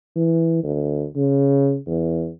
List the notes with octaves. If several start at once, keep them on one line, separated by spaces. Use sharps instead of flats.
E3
D2
C#3
E2